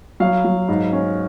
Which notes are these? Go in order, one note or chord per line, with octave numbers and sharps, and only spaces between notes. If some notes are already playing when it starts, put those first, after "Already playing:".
F#3 F5
F#3
G#2
C#4